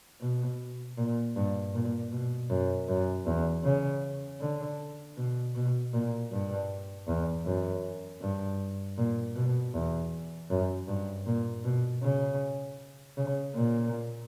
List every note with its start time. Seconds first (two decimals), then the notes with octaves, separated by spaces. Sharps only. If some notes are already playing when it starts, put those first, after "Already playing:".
0.22 B2
0.98 A#2
1.36 G2
1.74 A#2
2.12 B2
2.50 F#2
2.89 F#2
3.27 E2
3.64 C#3
4.41 D3
5.17 B2
5.55 B2
5.93 A#2
6.32 G2
7.08 E2
7.46 F#2
8.21 G2
8.98 A#2
9.36 B2
9.74 E2
10.50 F#2
10.88 G2
11.27 A#2
11.65 B2
12.03 C#3
13.17 C#3
13.55 A#2